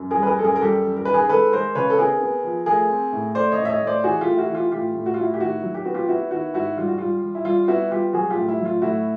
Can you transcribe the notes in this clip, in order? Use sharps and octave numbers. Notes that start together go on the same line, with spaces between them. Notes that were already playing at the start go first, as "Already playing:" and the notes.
Already playing: F#2
G3 G#4 A#4
B4
G#4 A#4
F#2 A4
G#4 A#4
A#4
G3 G4 A4
F#2
A#4
D#3 B4
G#4 A#4
G#3 A4 B4
G#3 A#4 C5
C#3 B4 C#5
A4
B3 G#4 A#4
B3
F3
A3 G#4 A#4
C4
A2
A3 C5 D5
C#5 D#5
A2
E5
C#5 D#5
A2
C5 D5
E3 F#4 G#4
A3 F4 G4
E4 F#4
E3
F4 G4
A2 F4 G4
A2
F#4
F4
A2 E4 F#4
G4
D#3 E4 F#4
F#3
G4
B3 F#4
F4 G4
B3 E4 F#4
D#3 E4 F#4
G#2 E4 F#4
G3 F4
F#4
G3 F4
G3
E4
G3 F4
B3 E4 F#4
G3 F4 G4
F#3 F#4 G#4
F4 G4
A2
E4
F#3
F4
A2 E4 F#4